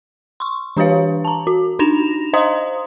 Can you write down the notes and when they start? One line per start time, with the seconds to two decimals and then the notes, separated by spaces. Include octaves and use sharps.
0.40 C6 C#6
0.77 E3 D4 G4 B4 C#5 F5
1.25 A5 A#5
1.47 F#4
1.79 D4 D#4 A#6 E7 F7
2.33 C5 D#5 F5 A#5 C6 D#6